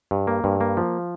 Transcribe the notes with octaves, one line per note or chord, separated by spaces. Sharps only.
G2
A#3
G2
A#3
F3